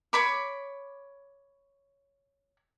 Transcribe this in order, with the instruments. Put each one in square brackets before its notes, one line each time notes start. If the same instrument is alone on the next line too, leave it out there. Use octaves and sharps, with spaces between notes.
[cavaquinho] C#5 B5 D6